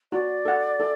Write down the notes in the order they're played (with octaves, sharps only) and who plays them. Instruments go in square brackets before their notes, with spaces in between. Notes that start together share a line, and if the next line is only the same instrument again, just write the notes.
[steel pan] F#4 [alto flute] D5
[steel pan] A4 F#5
A4